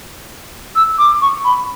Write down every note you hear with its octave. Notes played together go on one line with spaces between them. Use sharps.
E6
D6
C#6
B5